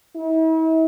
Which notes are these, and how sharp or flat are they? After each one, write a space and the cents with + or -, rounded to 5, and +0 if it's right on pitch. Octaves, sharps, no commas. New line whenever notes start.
E4 -45